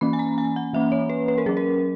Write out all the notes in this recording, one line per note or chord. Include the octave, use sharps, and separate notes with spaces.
E3 A#3 C#4 B5
G#5
A#5
G#5
F#5
E3 A#3 C#4 E5
C#5
B4
B4
A#4
F#3 C#4 G#4
A#4